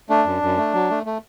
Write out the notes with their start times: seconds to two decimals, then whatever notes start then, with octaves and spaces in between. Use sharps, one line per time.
0.10 A3 D4
0.26 F#2
0.42 F#2
0.57 A3
0.74 F#3
0.90 A3
1.06 A3